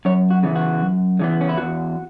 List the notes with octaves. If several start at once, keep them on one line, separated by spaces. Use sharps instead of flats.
F#2 C#5
F#4
C#3 E3 B3
F#4
F#2
C#3 E3 B3
C#4
E4
E2 F#4